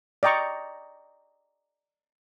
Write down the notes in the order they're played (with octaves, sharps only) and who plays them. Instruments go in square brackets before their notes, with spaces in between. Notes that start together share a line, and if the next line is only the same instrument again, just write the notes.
[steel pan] D5 D#5 G5 A#5 C#6